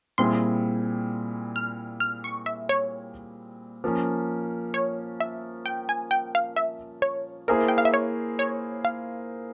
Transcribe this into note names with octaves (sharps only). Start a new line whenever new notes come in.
A#2 G3 C4 E4 G#4 C6
F6
F6
C#6
E5
C#5
F3 A#3 C#4
C#5
E5
G5
G#5
G5
F5
E5
C#5
A#3 E4 G#4 A#4 C5
G5
F5
E5
C#5
C#5
F5